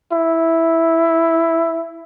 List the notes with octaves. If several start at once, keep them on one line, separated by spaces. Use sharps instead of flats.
E4